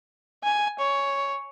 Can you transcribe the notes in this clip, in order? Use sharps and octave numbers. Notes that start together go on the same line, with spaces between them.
G#5
C#5